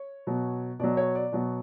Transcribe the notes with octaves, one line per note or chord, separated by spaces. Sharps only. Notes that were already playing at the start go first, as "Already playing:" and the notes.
Already playing: C#5
B2 F#3
B2 F#3 D5
C#5
D5
B2 F#3